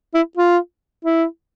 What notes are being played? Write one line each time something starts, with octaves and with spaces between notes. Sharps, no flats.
E4
F4
E4